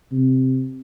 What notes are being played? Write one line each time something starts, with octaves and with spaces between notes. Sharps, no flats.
C3